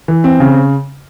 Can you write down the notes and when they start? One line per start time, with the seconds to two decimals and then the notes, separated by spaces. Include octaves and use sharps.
0.08 E3
0.24 C4
0.40 C#3